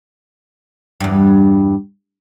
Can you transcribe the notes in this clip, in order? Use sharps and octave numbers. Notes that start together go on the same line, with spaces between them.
E2 G2